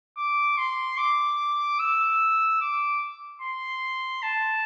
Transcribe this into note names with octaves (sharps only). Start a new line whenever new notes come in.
D6
C6
D6
E6
D6
C6
A5